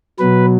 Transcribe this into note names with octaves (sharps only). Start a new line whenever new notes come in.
B2 F#3 B4